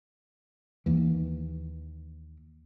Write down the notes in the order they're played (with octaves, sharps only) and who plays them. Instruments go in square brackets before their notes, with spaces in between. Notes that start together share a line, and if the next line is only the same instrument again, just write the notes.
[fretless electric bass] D#2 E3